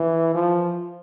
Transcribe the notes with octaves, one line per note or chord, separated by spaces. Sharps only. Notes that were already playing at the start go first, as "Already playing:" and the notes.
Already playing: E3
F3